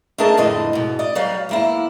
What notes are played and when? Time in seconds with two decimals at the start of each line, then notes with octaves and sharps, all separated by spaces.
0.18 A3 D4 G#4 A#4 D#5 A5
0.37 F2 A2 D3 D#5
0.73 G#2 B2
0.99 D5 D#5
1.15 F#3 G3 F5
1.49 E2 A#3 E4